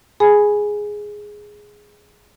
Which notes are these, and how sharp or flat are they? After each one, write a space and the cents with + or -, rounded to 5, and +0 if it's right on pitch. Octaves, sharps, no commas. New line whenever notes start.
G#4 +0 G#5 +0 B5 +0